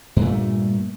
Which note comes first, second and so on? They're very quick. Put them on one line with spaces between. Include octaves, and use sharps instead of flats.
G2 A#2 A3